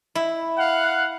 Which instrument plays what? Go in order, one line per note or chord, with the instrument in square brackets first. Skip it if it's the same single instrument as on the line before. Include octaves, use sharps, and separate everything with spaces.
[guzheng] E4
[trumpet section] F5 F#5